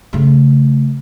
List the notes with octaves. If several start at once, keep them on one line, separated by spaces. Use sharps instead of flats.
C#3 A3